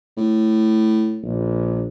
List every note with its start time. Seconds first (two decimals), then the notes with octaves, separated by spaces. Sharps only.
0.17 A2
1.23 A#1